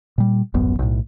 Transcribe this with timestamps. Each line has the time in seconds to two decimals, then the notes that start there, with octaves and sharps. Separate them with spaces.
0.18 A#2 G3
0.54 D#1 A1 F#2 B3
0.79 B1 A2